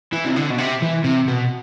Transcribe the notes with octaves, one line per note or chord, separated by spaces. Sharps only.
E3
C3
D3
B2
C3
E3
C3
B2